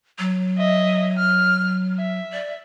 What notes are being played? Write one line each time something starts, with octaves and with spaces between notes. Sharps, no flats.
F#3
D#5 E5
F6
E5
D5